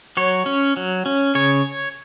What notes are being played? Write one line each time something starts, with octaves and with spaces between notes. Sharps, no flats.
F#3 C#5
C#4
F#3
C#4
C#3 C#5